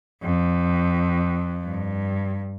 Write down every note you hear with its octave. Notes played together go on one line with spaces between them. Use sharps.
F2
G2